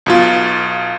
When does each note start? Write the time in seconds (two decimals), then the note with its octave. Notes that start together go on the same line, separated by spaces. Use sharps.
0.06 B1 B2 F4